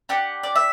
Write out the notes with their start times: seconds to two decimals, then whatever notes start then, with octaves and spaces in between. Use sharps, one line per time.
0.09 D4 G4 F#5
0.43 D5
0.56 E5